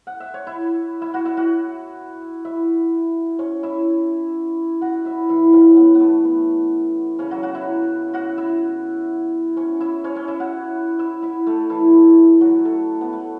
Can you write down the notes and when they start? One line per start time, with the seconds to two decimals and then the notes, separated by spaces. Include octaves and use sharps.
0.07 F#5
0.20 E5
0.34 C#5
0.47 E4 E5
1.02 E4 E5
1.14 F#4 F#5
1.25 E4 E5
1.37 F#4 F#5
2.45 E4 E5
3.39 C#4 C#5
3.63 E4 E5
4.81 F#4 F#5
5.05 E4 E5
5.29 E3 E4
5.53 C#3 C#4
5.77 B3
5.95 B3
6.00 A3
6.25 B3
7.19 C#3 C#4
7.31 F#3 F#4
7.43 F#4 F#5
7.55 E4 E5
8.14 F#4 F#5
8.38 E4 E5
9.57 C#4 C#5
9.80 E4 E5
10.04 C#4 C#5
10.15 C#4 C#5
10.28 E4 E5
10.40 F#4 F#5
10.99 E4 E5
11.22 E4 E5
11.47 A3 A4
11.70 E3 E4
12.41 F#3 F#4
12.65 A3 A4
13.01 B3
13.13 A3